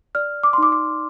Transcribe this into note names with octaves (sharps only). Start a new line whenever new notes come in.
D5 F6
D6
C6
D#4 D6
D6